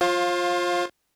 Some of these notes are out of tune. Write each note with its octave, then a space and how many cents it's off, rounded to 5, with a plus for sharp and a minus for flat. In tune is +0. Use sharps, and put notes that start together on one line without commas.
F4 +10 C5 +40 F5 +20